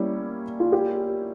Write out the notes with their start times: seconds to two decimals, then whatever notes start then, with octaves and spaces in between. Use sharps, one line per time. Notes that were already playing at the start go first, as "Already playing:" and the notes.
Already playing: G3 A#3 C#4 E4
0.60 F4
0.72 G4